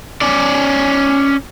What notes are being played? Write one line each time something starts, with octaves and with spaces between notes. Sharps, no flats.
C#4 D5